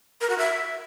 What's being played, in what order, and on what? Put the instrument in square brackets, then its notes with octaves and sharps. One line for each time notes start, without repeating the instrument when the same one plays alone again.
[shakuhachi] A#4
F#4
E5